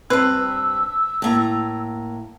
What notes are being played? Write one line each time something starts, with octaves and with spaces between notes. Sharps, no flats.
G2 C4 B4 E6
A2 A#3 A#5